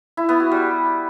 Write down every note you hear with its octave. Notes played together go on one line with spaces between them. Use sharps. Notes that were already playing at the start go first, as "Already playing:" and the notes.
E4
B3
F#4
G3